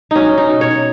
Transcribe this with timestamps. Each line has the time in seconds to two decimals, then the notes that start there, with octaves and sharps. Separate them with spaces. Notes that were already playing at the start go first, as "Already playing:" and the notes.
0.11 F#3 C#4 D#4
0.38 D#4
0.49 B2
0.61 C#5